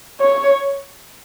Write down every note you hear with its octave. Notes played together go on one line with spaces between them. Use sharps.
C#5